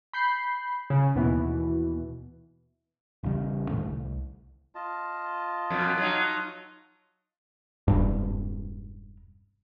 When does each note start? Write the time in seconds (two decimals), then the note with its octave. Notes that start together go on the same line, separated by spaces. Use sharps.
0.13 B5 G6 C7
0.90 C#3
1.15 D#2 B2 E3
3.23 A1 E2 C#3 G3
3.70 A2 D3 D#3 A3
3.85 C2
4.75 F4 D#5 A5
5.70 F2 B2
5.98 F#3 D#4
7.88 E1 G2